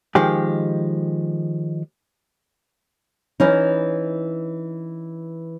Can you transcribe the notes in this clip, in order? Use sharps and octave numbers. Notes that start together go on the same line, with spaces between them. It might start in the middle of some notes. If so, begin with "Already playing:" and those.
D#3 F3 G#3 G4
E3 C#4 D#4